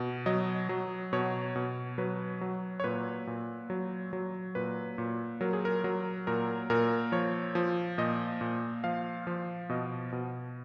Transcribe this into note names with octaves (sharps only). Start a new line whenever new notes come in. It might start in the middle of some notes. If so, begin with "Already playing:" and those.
Already playing: B2
F#3 D#5
F#3
B2 C#5
B2
F#3 B4
F#3
C#5
A#2 B4
A#2
F#3
F#3
A#2 B4
A#2
F#3 A#4
G#4
A#4
F#3 A#4
A#2 A#4
A#2 A#4
F3 C#5
F3
A#2 D#5
A#2
F3 F5
F3
B2 D#5
B2